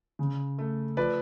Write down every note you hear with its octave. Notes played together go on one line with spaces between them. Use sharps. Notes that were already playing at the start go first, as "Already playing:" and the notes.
C#3
A3
F3 B4 D5